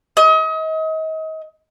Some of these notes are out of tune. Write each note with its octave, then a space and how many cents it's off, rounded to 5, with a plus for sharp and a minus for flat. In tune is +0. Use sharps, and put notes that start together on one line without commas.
D#5 +35